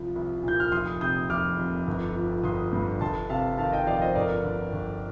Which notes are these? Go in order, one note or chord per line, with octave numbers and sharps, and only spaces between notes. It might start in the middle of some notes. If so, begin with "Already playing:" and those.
Already playing: C2 F3
C2
A#2 G6
F6
F1 C6 D#6
C3 D#6 G6
F1 D6 F6
F2
G1
F3
G1 C6 D#6
G2
G1 A5 C6
C3 F5 A5
D#3 F5 A5
D#5 G5
F2 D5 F5
C5 D#5
G1 A#4 D5
D3
G1